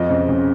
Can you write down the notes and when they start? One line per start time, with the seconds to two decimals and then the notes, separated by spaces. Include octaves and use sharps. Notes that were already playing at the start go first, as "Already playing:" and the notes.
Already playing: F2 D#5
0.10 C#3
0.29 C#3